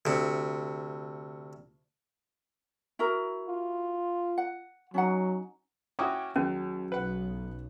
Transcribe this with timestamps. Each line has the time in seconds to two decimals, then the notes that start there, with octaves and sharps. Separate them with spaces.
0.05 D2 C3
2.99 E4 F#4 A#4
3.48 F4
4.38 F#5
4.94 F#3 C#4 D#4 F#5
5.99 C#4 E4 F#4 G5 D6 D#6
6.36 D#2 F#3 C#4 G#4
6.92 B1 B4 F#5